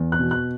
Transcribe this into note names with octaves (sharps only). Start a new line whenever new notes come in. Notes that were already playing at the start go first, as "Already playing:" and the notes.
Already playing: E2
F#6
B2
F#6